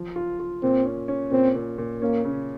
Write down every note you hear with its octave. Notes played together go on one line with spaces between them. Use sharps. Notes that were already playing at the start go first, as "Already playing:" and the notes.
Already playing: F3
F4
F4
A#2 C4
C#4
C#4
A#2 C4
A#2
A#2
A#3 C#4
C#3